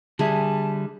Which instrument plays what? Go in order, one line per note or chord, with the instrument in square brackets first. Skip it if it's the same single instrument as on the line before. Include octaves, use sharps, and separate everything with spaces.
[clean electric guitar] D3 G3 E5 [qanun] G#4 [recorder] A5